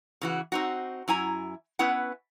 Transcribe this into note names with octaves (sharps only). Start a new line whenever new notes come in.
C#3 E3 F#4
C4 D#4 F#4
F#2 E4 G#5 A#5
B3 C#4 E4 B4 F#5